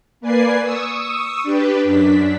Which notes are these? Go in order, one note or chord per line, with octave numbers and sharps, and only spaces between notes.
A#3 B4 D5 G#5 C7
C#6 D#6 E6
D4 G4 B4
F#2 D4 B6